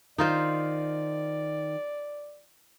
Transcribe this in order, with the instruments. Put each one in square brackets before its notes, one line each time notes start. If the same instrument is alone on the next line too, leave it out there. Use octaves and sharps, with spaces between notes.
[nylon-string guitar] D#3 [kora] D#4 F4 C5 [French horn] D5